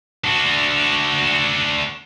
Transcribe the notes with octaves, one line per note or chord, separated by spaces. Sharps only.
D4 F#4